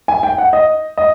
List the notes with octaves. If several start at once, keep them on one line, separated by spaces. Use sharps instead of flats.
G#5
G5
F#5
D#5
D#5